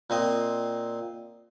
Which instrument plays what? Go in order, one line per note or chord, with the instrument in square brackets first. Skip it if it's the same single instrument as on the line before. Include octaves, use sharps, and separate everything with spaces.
[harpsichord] A#2 C4 D#5